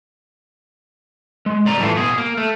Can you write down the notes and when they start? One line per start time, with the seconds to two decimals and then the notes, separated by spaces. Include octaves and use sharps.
1.46 G#3
1.65 C2 D5 A#5
1.79 F#2 A2 E3 A3 F4
1.97 B2 G#4
2.18 A#3
2.37 A3